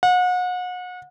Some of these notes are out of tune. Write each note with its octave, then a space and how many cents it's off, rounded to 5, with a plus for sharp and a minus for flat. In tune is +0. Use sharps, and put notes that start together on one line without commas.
F#5 -35